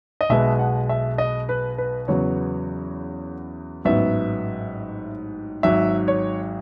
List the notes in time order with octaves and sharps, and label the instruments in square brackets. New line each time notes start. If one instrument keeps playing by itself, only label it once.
[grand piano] D#5
B1 B2 G#3 B3 E5
F#5
E5
D#5
B4
B4
E2 C#3 F#3 B3 C#5
A1 G#2 F#3 B3 E5
G#1 G#2 F#3 E5
C#5